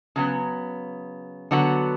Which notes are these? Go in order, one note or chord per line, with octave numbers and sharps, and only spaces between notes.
C#3 F#3 B3
D3 F#3 B3 F#4